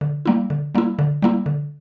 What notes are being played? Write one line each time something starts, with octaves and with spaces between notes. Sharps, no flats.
D3
G3 A#3 E4
D3
G3 A#3 E4
D3
G3 A#3 E4
D3